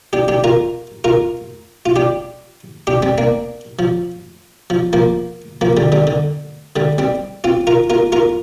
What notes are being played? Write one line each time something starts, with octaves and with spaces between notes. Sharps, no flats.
D4 G4
D4 G4
F4 A#4
F4 A#4
F4
D4 G4
D4 G4
G3 C4
A#3 D4
F3
F3
F3 A#3
F3 A#3
D3 G3
D3 G3
D3
D3 G3
G3 C4
C4 F4
F4 A#4
F4 A#4
F4 A#4